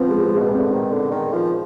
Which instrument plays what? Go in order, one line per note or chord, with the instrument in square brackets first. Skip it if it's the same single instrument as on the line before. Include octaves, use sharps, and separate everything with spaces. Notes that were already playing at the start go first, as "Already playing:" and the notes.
Already playing: [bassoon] F3 [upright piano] B3 C4
[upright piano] G#3
G#3
[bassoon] B2 [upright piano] B3
[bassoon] C3
[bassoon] D3 [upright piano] C4
[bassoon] D#3
D3
D#3
F3